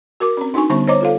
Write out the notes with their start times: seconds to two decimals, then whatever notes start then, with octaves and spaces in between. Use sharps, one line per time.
0.20 F#4 A#4 D6
0.37 C4 C#4
0.54 D4 D#4 F#4 G#5 C#6
0.70 D3 G3 B3 C#4 C#6
0.87 C5 C#5 D#5 A#5 D6
1.01 F4 A4 F5